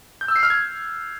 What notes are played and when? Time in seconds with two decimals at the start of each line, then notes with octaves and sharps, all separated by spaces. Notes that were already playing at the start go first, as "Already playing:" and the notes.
0.21 G6
0.28 E6
0.36 C7
0.43 F6
0.50 G#6